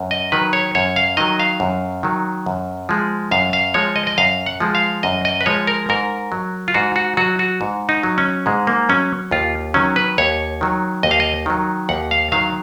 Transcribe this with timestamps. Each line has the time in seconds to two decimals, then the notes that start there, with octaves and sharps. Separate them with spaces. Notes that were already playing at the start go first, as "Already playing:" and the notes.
Already playing: F#2
0.11 D#5
0.32 D#3 F#3 B4
0.53 C#5
0.75 F#2 C#5
0.96 F5
1.17 D#3 F#3 D#5
1.39 F5
1.60 F#2
2.03 D#3 F#3
2.46 F#2
2.89 F3 G#3
3.31 F#2 F5
3.53 F5
3.74 F3 G#3 C#5
3.96 D#5
4.07 D#5
4.18 F#2 F5
4.46 F#5
4.60 F3 G#3
4.75 F5
5.03 F#2 D#5
5.25 D#5
5.41 B4
5.46 F3 G#3 C#5
5.67 A#4
5.89 G#2 A#4
6.32 F#3
6.68 F4
6.74 G#2 F#4
6.96 F#4
7.17 F#3 F#4
7.39 F#4
7.61 G#2
7.89 D#4
8.03 F#3
8.18 C#4
8.46 G#2 G#3
8.67 A#3
8.89 F#3 C#4
9.31 D#2 F4
9.74 D#3 F#3 C#4
9.96 B4
10.18 D#2 C#5
10.61 D#3 F#3
11.03 D#2 D#5
11.11 F5
11.20 D#5
11.46 D#3 F#3
11.89 D#2 F#5
12.11 F5
12.32 D#3 F#3 F5